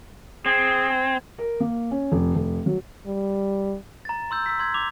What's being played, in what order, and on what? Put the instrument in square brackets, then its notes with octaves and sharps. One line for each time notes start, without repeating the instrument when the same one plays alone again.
[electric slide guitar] C4 [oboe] G#4
[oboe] G#5
[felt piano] A#4
A#3
C#4
F1
F1
F#3
[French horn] G3
[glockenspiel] A#5 A6
C6 E6 G6
E6 B6
C6 G#6
D6 F7